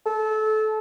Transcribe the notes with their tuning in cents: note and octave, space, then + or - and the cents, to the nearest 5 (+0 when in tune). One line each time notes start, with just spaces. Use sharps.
A4 -25